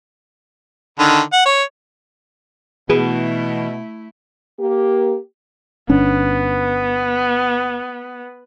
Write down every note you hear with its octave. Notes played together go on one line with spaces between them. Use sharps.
D3 D#3
F#5
C#5
B2 E3 A3 E4 G#4 B4
A#3 G4
G1 B3 C#4 D4